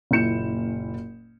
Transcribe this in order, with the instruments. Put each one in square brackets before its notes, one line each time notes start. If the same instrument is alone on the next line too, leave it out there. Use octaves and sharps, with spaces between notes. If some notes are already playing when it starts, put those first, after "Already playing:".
[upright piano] F#1 A#2 E4 G6 C#7 E7